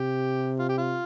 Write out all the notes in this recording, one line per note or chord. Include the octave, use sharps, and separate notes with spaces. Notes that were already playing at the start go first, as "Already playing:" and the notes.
Already playing: C3 G4
F4
G4
F4